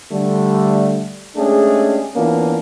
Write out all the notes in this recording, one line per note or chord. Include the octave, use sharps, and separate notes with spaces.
D3 G3 A3
G#3 A3 C#4 D4 G4 G#4
E3 A#3 B3 C#4 D4 F4